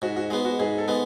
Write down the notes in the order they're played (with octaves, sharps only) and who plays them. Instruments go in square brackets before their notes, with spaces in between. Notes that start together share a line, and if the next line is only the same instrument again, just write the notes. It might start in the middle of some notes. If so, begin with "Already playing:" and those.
[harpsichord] G#2 [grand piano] F#4
[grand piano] F#4
[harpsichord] G#3 B3 [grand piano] G#4
[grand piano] F#4
[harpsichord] G#2 [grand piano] G#4
[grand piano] A4
[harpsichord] G#3 B3